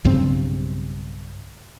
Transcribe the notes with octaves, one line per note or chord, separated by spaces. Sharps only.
B1 G2 C#3 C4